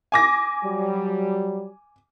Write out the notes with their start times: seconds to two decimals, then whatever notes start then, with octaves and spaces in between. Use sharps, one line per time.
0.12 G#5 D6 A#6
0.65 F#3 G3